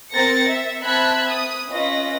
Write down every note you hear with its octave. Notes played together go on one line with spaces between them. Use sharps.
C4 A#4 A6 A#6 C#7
E5
C4 E5 A5 B5 F#6 G#6
D#6
C#4 F4 B4 D#5 A#6